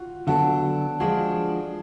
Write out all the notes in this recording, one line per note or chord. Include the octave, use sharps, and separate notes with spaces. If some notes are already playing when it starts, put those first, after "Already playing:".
Already playing: F4 F#4
D3 F#3 B3 D4 F#4 A4
F3 G#3 D4 F4 F#4 G#4